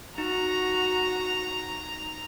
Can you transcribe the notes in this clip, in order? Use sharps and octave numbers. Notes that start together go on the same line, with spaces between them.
D#4 F#4 A#5